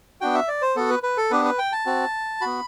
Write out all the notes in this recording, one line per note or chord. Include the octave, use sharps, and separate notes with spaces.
B3 D4 F#4 G5
E5
D5
C5
B3 F#4 A4
B4
B4
A4
B3 D4 G4 B4
B4
G5
A5
C4 F#4
B3 F#4 B5